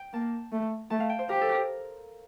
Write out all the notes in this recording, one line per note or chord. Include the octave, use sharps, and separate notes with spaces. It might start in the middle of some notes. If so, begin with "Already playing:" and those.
Already playing: G5
A#3 A5
A3
A3 A5
F5
G5
C5
G4 A#4
A4
A#4